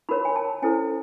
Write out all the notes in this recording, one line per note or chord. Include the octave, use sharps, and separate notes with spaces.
D#4 F#4 A#4 C#5 B5
G#5
A5
C#4 E4 A4 C5 G#5